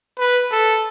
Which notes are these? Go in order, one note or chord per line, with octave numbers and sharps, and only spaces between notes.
B4
A4